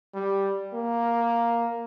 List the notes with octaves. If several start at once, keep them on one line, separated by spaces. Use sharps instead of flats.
G3
A#3